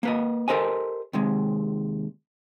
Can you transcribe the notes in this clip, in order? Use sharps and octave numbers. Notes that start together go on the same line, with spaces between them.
A#3 B4 D#5
G4 A4 A#4 C5 D#5 G#5
D#2 C3 G#3